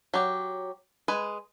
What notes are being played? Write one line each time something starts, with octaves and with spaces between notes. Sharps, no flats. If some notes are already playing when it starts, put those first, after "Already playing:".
F#3 G4
G#3 B4 G#5